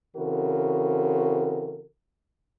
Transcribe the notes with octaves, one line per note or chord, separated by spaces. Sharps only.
C#3 E3 C4 F#4 A4 A#4